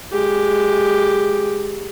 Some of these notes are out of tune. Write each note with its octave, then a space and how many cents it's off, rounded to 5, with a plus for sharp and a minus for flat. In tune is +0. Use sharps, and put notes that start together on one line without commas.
G#3 +0 G4 +0